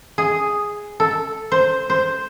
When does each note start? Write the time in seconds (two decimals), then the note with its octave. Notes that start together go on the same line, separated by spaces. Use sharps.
0.18 G#4
1.00 A4
1.52 C5
1.90 C5